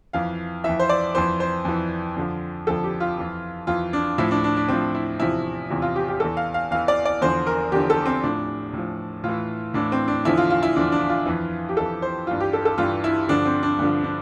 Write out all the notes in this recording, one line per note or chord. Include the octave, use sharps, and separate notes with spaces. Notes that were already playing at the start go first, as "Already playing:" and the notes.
F2 E3 F5
F2 E3 E5
C5
D5
F2 E3 C5
C5
F2 E3
F2 D3 F3
F2 D3 F3 A4
G4
F4
F2 E3
F2 E3 F4
D4
A2 F3 E4
D4
D4
D4
A2 F3 C4
E4
E2 C3 F3 E4
E2 C3 F3 E4
F4
G4
G4
E2 E3 A4
F5
F5
E2 E3 F5
D5
D5
E2 D3 F3 C5
A#4
E2 D3 F3 G4
A4
C4
A2 F3 D4
A2 F3
A2 E3 F4
A2 E3 D4
C4
D4
E2 D3 F3 E4
F4
F4
E4
E2 D3 F3 D4
D4
F4
F2 E3
G4
F2 E3 A4
C5
G2 E3 F4
G4
A4
A4
G2 E3 F4
E4
G2 D3 F3 D4
C4
D4
G2 D3 F3
D4